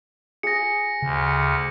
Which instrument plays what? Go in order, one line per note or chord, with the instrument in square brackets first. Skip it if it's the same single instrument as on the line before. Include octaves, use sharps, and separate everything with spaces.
[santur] G#4 [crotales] A#6 C#7
[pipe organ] D2 [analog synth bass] C#3